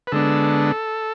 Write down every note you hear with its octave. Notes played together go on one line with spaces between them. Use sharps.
B4
D3 G#3 B3 D4 A4